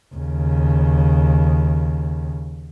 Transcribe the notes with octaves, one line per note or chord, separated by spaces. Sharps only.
D#2 C#3